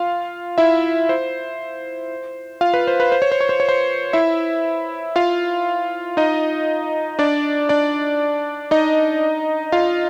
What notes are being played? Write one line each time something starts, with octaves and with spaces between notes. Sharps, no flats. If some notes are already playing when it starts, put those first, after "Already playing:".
Already playing: F4 F5
E4 E5
C5
F4 F5
B4
C5
B4
C5
C#5
C5
C#5
C5
C#5
C5
E4 E5
F4 F5
D#4 D#5
D4 D5
D4 D5
D#4 D#5
F4 F5